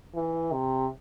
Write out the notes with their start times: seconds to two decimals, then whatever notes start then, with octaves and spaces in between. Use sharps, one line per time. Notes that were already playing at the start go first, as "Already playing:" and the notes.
0.15 E3
0.53 C3